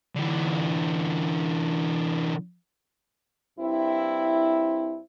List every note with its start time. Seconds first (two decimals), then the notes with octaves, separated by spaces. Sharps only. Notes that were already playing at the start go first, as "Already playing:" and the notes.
0.15 D3 E3
3.59 G2 C4 E4